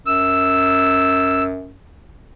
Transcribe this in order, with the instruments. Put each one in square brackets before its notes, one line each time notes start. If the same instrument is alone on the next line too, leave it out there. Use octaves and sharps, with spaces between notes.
[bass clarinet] F#2 [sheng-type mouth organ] E6